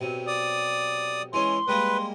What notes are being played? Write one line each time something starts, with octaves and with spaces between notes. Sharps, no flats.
B1 C3
D5 D#6
E3 G#3 C#4 C6
G3 G#3 A#3 B4